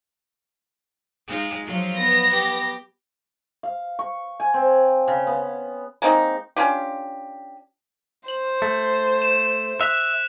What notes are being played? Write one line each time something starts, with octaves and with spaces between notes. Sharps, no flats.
G#3 D#4 F4
F3 F#3 F4
B3 A#6
G4
F5
C#6
G#5
C4
C#3
B3
G#3 A#3 C4 D#4
C#4 D4 F4 G4
C5 F#7
A3
E7
E5 F#6 B6 F7